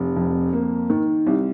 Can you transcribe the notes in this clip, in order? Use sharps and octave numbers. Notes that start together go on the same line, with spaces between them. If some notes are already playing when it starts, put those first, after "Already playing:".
Already playing: F1
F2
A#3
D#3
C2